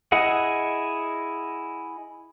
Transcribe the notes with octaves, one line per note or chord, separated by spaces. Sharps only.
E4 G#4 D#5 F#5